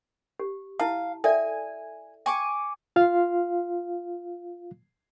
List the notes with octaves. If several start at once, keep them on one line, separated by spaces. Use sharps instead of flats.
G4
E4 F5 A5
A4 D5 E5 G#5
G#5 C#6 D6
F4 F5